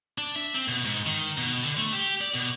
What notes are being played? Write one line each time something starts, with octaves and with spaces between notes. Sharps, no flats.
D4
E5
C4
B2
G#2
D#3
B2
D3
A3
G4
D5
B2